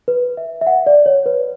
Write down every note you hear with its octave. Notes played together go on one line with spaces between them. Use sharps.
B4
E5
E5
F#5
D5
C#5
B4